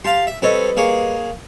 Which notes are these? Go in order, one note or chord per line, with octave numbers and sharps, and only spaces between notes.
G4 F5 A5 C6
E5
G3 C4 A4 B4 C#5 D#5
A#3 G#4 C#5